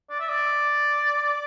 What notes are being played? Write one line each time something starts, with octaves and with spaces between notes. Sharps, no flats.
D5
E5
D5